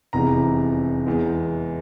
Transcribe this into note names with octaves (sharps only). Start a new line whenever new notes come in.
F1 E2 C3 E3 G#3 A#5
E2 E3 G#3